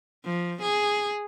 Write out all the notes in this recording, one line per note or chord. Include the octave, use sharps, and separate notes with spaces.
F3
G#4